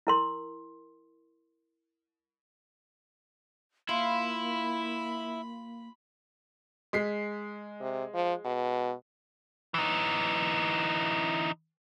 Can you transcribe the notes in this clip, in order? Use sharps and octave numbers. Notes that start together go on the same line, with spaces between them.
E4 A#4 C6
A#3 E4 F4 B5
G#3 B6 C7
C3
F3
B2
E3 D#4